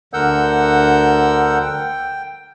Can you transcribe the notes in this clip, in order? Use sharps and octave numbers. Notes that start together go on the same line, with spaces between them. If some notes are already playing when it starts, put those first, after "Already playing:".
D2 D3 A#4 F#5 E6 G6
G5